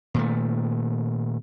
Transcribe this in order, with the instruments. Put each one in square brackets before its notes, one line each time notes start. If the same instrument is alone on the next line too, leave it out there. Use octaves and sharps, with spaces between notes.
[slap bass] A#2 D#3 A3